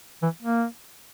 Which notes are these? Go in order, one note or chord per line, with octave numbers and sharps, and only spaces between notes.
E3
A#3